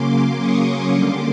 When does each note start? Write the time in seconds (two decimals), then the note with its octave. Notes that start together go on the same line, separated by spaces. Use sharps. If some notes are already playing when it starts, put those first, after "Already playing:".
Already playing: C#3 F#3 A#3 C#4 C6 D6
0.40 C#6 D#6
0.92 D3 G3 A#3 C#4 C6 D6